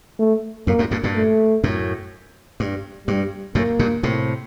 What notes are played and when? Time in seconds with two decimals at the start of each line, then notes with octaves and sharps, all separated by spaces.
0.19 A3
0.67 F#2 A2 A#3
0.79 F#2 A2
0.91 G2 A#2
1.03 G2 A#2
1.15 A3
1.64 F#2 A2
2.60 G2
3.07 G2 G3
3.55 F#2 A2 A#3
3.79 G2 A#2
4.03 A2 C3